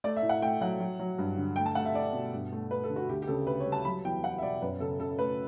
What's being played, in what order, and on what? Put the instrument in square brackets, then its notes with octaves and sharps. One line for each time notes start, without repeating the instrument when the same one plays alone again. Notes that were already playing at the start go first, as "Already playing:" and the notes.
[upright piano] A3 D5
E5
A2
F#5
A3 G5
F#3 F#5
F#3
F#3
G2
D3
A3 G5
A5
A3 F#5
E5
A3 D5
B2
G2
A3
A3 B4
A4
D3
F#4
D2 G4
G4
C#3 A4
D2 B4
C#5
G3
A5
F#3 B5
E2 G5
E2 F#5
E5
B2 D5
F#2 B4
C#3 A4
C#3 A4
A3 B4